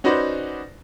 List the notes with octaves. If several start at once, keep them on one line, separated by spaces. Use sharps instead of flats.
C#4 D#4 F#4 B4 C5 D5